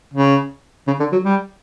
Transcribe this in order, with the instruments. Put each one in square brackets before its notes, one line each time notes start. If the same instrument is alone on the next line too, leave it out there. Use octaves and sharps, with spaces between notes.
[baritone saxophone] C#3
C#3
D3
F#3
G3